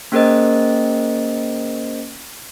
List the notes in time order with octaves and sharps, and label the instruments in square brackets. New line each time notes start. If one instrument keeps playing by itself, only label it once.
[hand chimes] A#3 C#4 G#4 A#4 C5 D#5